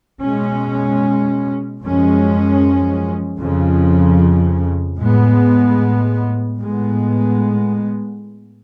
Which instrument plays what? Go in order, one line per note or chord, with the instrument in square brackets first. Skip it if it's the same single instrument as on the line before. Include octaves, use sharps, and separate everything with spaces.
[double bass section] B2 G#3 C#4
F#2 F3 G#3 C#4
F2 C#3 F3
A2 G#3 B3
A2 G#3 B3